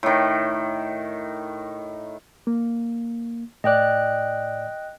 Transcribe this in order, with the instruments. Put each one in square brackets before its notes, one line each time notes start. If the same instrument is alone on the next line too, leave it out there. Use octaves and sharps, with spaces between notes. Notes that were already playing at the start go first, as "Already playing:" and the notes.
[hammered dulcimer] A2 D#3
[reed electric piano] A#3
[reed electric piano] A2 D5 [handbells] D#5 G5 F#6